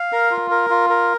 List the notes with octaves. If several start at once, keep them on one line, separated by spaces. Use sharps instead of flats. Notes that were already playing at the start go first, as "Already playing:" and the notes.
Already playing: F5
A#4
F4
A#4
F4
A#4